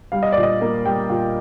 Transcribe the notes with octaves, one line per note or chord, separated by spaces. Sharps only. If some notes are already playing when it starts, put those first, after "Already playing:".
G3 F5
D#5
A#2 D5
D#5
A#3
G3 G5
A#2